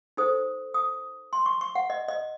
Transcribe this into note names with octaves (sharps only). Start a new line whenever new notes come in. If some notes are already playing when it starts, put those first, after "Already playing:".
D#4 A4 C5 D#6
D#6
C6
C#6
C#6
F#5
D#5
D#5